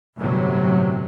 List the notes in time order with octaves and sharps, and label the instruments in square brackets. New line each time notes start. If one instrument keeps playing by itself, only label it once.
[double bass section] G1 A2 C3 F#3